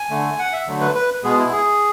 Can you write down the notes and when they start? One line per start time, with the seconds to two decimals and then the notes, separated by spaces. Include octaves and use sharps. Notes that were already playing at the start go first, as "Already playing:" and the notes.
Already playing: G#5
0.10 D3 A3
0.39 F#5
0.53 E5
0.67 D3 F#3 A3
0.81 B4
0.95 B4
1.24 B2 G#3 B3 G#4
1.38 E4
1.52 G#4